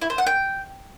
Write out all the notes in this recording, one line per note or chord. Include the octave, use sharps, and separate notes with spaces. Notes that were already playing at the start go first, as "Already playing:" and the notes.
E4
C5
F#5
G5